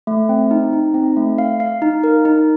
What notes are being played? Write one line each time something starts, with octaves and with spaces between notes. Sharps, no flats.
A3
C4
D#4
D#4
C4
A3
F5
F5
D#4
A#4
D#4